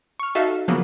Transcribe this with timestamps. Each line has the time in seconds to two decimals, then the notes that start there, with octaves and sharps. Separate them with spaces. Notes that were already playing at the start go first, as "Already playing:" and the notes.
0.20 C#6 F6
0.35 D#4 F#4 A4 E5 F5
0.68 C#3 F3 F#3 A#3 B3